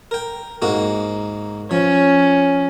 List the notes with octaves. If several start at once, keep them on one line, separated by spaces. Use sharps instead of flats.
A#4 G5
G#2 A#3 F#4
F3 C#4